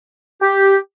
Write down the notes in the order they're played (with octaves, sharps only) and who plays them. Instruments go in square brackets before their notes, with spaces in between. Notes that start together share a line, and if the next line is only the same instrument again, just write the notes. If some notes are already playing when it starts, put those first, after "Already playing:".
[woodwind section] G4